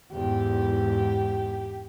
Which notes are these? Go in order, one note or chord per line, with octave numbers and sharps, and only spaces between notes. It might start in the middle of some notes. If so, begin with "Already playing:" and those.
E2 G#2 G4